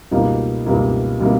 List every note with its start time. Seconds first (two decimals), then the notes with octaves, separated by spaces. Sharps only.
0.11 C#2 B2 G3 A#3 D#4
0.65 C#2 B2 G3 A#3 D#4
1.20 B2 G3 A#3 D#4